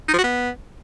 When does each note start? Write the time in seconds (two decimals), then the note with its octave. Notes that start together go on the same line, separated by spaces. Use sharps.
0.08 D#4
0.13 F3
0.18 F#4
0.23 B3